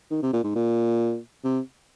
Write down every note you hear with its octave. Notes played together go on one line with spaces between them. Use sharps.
D#3
C3
A#2
G#2
A#2
C3